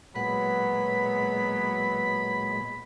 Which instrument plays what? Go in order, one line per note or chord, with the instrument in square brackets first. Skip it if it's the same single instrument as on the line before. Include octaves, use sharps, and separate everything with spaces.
[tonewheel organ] A#2 G#3 [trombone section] F#3 B3 [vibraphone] B4 F#5 [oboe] B5